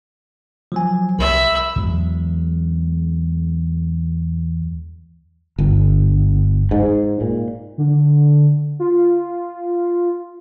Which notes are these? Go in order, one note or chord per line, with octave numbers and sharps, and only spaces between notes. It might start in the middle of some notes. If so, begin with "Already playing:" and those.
F3 F#3 G#5
C2 E5 B5
E2 F#3 G#3
G1
G#2
A#2
D3
F4